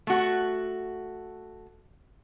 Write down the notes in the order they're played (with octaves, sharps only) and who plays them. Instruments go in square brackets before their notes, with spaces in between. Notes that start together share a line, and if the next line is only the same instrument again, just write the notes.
[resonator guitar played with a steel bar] A3 F#4